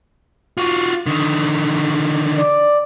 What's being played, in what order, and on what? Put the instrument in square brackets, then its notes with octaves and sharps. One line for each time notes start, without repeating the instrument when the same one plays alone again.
[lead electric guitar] F4 F#4
D3 D#3
[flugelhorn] D5